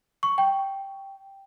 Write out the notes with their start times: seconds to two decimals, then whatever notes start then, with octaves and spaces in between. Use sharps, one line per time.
0.23 C#6
0.38 G5